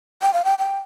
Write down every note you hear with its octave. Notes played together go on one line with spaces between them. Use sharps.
G5
F5
G5
G5